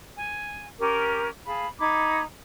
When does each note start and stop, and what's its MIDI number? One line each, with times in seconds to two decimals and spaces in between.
0.16 0.66 80
0.79 1.29 61
0.79 1.29 67
0.79 1.29 70
0.79 1.29 86
1.47 1.67 68
1.47 1.67 77
1.47 1.67 81
1.47 1.67 83
1.79 2.22 63
1.79 2.22 83
1.79 2.22 86
1.79 2.22 92